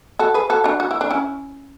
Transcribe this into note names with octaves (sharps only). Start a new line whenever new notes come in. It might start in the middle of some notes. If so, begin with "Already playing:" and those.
F#4 A4
G#4 B4
F#4 A4
D4 F#4
F#4
E4
D4
C#4 E4